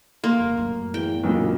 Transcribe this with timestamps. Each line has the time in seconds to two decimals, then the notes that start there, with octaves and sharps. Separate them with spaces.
0.24 A#3 C6
0.40 E1
0.57 F#2 A2
0.94 E2 G5
1.24 E1 B1 A#2 C#3